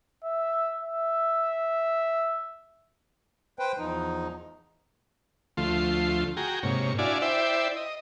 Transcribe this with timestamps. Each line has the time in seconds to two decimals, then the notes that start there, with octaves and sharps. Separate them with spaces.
0.24 E5
0.81 E5
3.59 B4 C5 G5
3.78 E2 F3 D#4
5.57 D2 F3 A3 F4 C6
6.37 F#4 G#4 G5 A#5
6.63 G#2 C3 A#3 C#5
6.98 D4 E4 F#4 D5 F5 G#5
7.22 E4 C5 D5 E5 G5
7.76 D#5